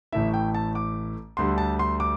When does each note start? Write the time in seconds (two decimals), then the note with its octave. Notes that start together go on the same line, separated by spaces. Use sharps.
0.12 A1 A2 A3 E4 E5
0.34 G5
0.54 A5
0.75 D6
1.37 D2 D3 G3 C6
1.58 A5
1.79 C6
2.00 D6